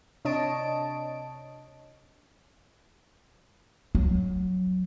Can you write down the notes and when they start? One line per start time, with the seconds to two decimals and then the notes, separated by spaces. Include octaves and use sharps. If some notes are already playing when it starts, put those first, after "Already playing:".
0.25 C3 D4 C#5 D#5 A5 D7
3.95 F#3